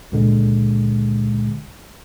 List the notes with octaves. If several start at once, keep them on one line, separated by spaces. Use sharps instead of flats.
C#2 A#2 D3 G#3